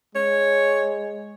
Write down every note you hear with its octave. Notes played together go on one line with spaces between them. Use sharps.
G#3 C#5